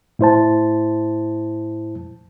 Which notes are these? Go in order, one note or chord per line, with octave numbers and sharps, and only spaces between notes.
A2 E4 C5 A5